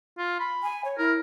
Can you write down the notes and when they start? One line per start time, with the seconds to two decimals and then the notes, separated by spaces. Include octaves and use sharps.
0.18 F4
0.40 B5
0.63 G#5
0.85 C#5
0.98 E4 A#4